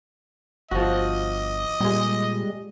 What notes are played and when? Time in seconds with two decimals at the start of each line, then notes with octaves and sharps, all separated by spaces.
0.71 G1 F3 F#4 D#5
1.81 A#2 G3 G#3